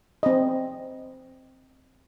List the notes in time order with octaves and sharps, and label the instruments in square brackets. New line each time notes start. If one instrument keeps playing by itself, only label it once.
[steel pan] C4 D#5